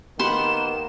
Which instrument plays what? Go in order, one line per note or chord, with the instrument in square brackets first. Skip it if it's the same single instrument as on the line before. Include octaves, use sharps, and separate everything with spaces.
[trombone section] D#3 A#3 B3 [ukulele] G4 B5 [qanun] F#5 C6 [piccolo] E7